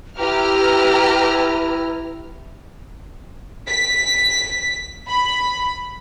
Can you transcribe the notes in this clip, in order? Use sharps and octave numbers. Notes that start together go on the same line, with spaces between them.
E4 G4 B4 A#5 F6
B6
B5